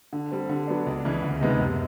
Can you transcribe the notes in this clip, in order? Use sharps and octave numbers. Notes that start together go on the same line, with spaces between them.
D3
G3 C4
D3
F#3 B3 D4
C#2
C#3 E3
D2
C3 D#3 G#3 B3
F#2